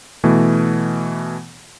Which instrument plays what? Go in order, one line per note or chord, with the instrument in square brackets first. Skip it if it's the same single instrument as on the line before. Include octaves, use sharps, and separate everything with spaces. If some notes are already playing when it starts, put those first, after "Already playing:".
[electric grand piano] B2 E3 A3